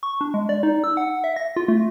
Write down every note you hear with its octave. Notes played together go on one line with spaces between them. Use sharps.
C#6
D4
G#3
D5
D#4
E6
F#5
E5
A#6
F4
A3